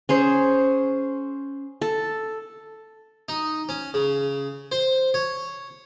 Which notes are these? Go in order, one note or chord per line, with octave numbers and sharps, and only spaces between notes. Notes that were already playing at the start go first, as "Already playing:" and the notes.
C#4 G#4 C5
A4
D#4
C#4
C#3
C5
C#5